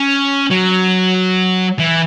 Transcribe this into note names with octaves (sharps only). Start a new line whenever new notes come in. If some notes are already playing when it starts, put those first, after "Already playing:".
Already playing: C#4
F#3
E3